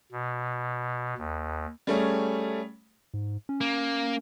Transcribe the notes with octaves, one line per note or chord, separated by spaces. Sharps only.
B2
D#2
G3 A3 C#4 G#4
G#2
C#4
A#3